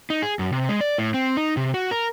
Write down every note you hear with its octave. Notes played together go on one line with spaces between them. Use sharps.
D#4
G#4
F#2
C3
G#3
D5
A2
C4
D#4
C3
F#4
A#4